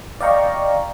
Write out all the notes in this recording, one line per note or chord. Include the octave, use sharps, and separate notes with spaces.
D5 D#5 F5 G5 A#5 C#6